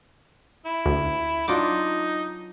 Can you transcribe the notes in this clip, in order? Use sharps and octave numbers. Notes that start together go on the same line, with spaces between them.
E4
D2
F#3 D4 D#4 F4 D6